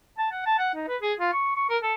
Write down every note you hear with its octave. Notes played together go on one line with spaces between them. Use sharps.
A5
F#5
A5
F#5
D#4
B4
G#4
F4
C#6
C#6
A#4
A4